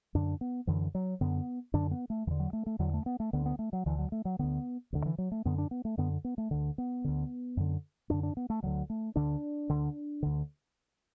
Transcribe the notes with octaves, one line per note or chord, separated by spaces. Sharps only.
F#2 D3 D4
B3
F#2 D3 E3
F#3
F#2 D3 B3
F#2 D3 D4
B3
A3
E2 D3 E3
F#3
A3
A3
E2 D3 F#3
A3
B3
A3
D2 D3 B3
B3
A3
F#3
D2 D3 E3
F#3
A3
F#3
D2 D3 B3
D2 D3
E3
F#3
A3
F#2 D3 B3
D4
B3
A3
F#2 D3 B3
B3
A3
D2 D3
B3
D2 D3
F#2 D3
F#2 D3 D4
D4
B3
A3
D2 D3 F#3
A3
D2 D3 D4
D2 D3
D2 D3